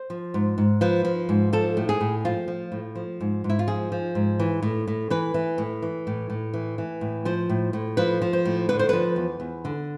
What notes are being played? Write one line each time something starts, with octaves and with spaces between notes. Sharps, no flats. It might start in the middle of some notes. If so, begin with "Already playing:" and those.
Already playing: C5
F3
G#2
G#2
F3 B4
F3
G#2
F3 A4
A2
G#4
A2
F3 F4
F3
A2
F3
G#2
G#2
E4
F4
F3 G#4
F3
G#2
E3
A2
A2
E3 B4
E3
A2
E3
A2
A2
E3
E3
A2
F3 C5
A2
A2
F3 B4
F3
C5
A2
D3 B4
C5
F3 B4
E2
E2
D3